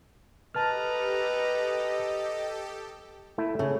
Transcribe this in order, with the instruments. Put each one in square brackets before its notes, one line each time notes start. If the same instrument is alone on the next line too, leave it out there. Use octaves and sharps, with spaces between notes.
[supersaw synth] G4 A4 [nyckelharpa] B4 A#5 [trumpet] D#5 [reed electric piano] A5 F6
[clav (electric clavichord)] A3 E4
[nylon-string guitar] C#3 [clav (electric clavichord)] A3